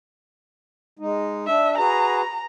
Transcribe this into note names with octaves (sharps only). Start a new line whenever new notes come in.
G#3 D#4
D4 E5
F#4 G#4 B4 A#5